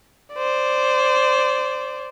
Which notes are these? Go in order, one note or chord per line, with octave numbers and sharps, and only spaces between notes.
C5 D5